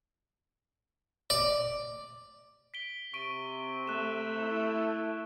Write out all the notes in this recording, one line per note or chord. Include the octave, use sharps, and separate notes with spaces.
D5
B6 D7 G7
C3 C#6 D7 D#7
A3 F#6 E7
E4